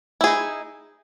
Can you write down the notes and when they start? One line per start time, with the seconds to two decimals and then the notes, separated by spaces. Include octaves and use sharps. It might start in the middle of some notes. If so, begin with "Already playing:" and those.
0.21 E4
0.24 G#4
0.27 D#4